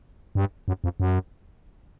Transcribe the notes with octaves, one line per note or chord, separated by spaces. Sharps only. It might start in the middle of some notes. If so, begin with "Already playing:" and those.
G2
F#2
F2
F#2